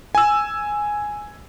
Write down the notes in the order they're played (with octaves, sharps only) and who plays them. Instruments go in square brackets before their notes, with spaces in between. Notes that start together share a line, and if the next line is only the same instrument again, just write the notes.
[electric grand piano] G#5 E6